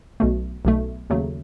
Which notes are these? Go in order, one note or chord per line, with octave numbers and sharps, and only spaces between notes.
B1 B2 A3
B1 B2 A3
D#2 C#3 F#3 A3